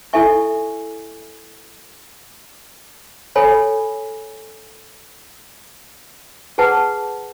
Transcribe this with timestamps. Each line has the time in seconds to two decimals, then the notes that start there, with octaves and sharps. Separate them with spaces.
0.13 E4 A4 E5 G#5 C#6
3.36 A4 C#5 G#5 B5
6.58 G#4 B4 F#5 A5